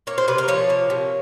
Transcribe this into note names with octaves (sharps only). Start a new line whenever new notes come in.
A#3 C#5
C5
C3 B4
A#4
F3 C#5
A#3
C3